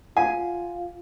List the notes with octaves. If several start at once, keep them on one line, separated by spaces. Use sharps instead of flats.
F4 F5 F#5 G#5